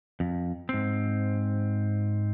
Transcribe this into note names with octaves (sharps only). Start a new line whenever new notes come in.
F2
G#2 C4